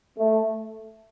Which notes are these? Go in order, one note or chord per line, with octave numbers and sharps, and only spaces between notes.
A3